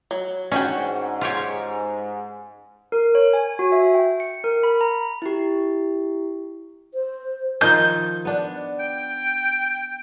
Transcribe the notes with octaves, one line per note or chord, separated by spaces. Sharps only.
F#3
G#2 C#4 D4 F#4 G5
F4 G4 C#5
A#4
C#5
G#5
F#4
E5
G5
C#7
A#4
B5
A#5
E4 G4
C5
D#3 F3 D#4 G6
B3 D4
G5